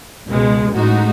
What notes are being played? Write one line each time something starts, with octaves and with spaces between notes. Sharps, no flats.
C#2 B2 G#3
A1 A2 G#3 D#4 F#4